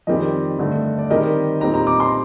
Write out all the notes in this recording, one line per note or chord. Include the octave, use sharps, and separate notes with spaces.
F2 D#3 G3 C4 G4 D#5
G2 D3 A3
D5
D#3 G3 C4 G4 A#4 D#5
A#2 G3 C4 D#4 A#5
A#5
D6
C6